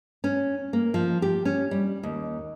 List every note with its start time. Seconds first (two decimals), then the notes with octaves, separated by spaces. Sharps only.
0.24 C#4
0.73 A#3
0.94 F3
1.22 G4
1.45 C#4
1.71 G3
2.03 D#2